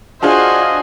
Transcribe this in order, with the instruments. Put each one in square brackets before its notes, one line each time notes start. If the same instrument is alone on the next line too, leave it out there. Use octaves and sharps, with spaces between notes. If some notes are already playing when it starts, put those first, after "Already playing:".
[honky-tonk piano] D4 F4 G#4 [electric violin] F#4 C5 [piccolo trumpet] D#5 [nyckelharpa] F#5 G#5